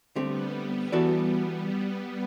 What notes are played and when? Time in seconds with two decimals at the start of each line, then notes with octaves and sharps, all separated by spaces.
0.16 D3 G3 A3 B3 C4 G4
0.92 E3 B3 F#4 A4 D5